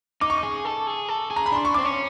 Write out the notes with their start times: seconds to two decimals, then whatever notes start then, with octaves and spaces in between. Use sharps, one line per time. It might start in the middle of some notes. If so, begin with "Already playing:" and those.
0.21 D#4 D6
0.30 C#6
0.38 D6
0.43 G#4
0.65 A4
0.87 G#4
1.08 A4
1.31 G#4
1.36 A#5
1.46 B5
1.52 D4 C6
1.65 C#6
1.74 C4 D6
1.85 C#4